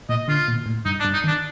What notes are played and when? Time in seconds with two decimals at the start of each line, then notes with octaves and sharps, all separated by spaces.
0.09 A#2 D#5
0.28 D3 F4
0.48 A#2
0.66 A2
0.85 G2 D#4
1.00 D4
1.05 G2
1.13 D#4
1.24 D#3
1.28 D4